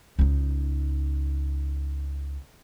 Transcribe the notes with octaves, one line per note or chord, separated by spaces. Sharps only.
C#2 D#4